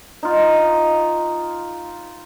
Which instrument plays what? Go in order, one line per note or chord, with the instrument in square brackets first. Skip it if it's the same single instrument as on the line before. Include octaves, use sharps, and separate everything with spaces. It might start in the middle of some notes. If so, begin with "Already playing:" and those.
[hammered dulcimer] D#4 F4